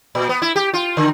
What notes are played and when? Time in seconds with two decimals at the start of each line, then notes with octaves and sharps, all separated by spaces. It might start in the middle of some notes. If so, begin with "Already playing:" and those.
0.15 A#2
0.29 B3
0.42 E4
0.56 G4
0.74 F4
0.97 D3